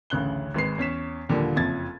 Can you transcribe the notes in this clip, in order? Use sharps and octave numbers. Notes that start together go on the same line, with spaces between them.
A1 D2 C#3 F#6 G7
G#1 G#3 B4 C7
E2 C#4 B6 E7
D#2 A#2 D3 F3 G3
F#1 F2 F3 G#6 A6